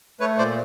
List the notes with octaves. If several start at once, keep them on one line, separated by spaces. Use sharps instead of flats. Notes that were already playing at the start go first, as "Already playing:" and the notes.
A3 B4 C#5
A#2 C5 D5